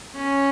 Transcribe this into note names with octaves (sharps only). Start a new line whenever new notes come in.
C#4